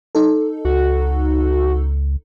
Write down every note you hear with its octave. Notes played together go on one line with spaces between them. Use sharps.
D#4 A4
C#2 F#4